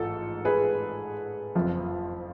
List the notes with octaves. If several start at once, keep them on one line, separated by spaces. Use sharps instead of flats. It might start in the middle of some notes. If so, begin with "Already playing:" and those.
Already playing: A1 G#2 F4 A4
G#4 B4
F#1 F2 F3